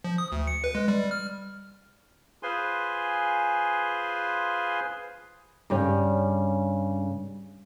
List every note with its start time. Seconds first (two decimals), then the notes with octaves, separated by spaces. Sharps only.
0.04 F3
0.18 D#6
0.32 D2
0.47 C#7
0.64 B4
0.75 G#3
0.88 G3
1.11 F6
2.43 F4 G#4 B4 C5 G#5 C6
5.70 G2 C#3 G3 C#4